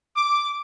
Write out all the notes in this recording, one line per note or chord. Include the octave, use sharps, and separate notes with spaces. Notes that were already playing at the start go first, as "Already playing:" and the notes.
D6